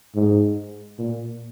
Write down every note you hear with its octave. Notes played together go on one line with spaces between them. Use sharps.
G#2
A#2